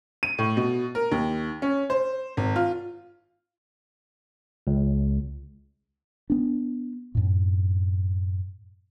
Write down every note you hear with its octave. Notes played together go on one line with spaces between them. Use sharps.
D#7
A2
B2
A#4
D#2
C#4
C5
G#1
F4
C#2
B3 D4
F#2 A2